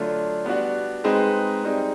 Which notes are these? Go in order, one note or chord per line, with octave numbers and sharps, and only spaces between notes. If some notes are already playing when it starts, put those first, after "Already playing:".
Already playing: D3 F#3 A3 D4 F4
G3 B3 D4 F#4
G#3 C4 D#4 G#4 B4
G3 C4 D#4 G#4